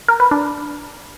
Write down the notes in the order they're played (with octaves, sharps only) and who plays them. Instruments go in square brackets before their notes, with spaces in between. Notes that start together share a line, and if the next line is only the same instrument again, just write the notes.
[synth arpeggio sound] A#4
B4
D4